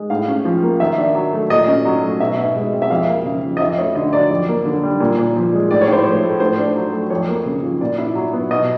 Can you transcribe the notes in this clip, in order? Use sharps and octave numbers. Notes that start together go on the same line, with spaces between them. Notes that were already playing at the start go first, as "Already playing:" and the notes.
Already playing: G#3
A2 F5
C#4
F3
A#3
D#3 E5
D4
F#3
A3
A#2 D#5
C#4
F#3
A3
B2 E5
B2
G#3
C4
E5
F2 F5
A#3
C#3
F3
D#5
F2 E5
A3 C#5
D3 D#5
F#3 D5
F2
A#3
D3
G3
A#2
A#2
F3
G#3
A2 D5
C#5
A2 C5
F3 C#5
A3
A2 C5
D4
F#3
A3
F2 C#5
A#3
C#3
F3
A#2 D5
E4
F#3
B3
B2 D#5